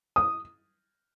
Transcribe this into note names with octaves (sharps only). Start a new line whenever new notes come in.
D#6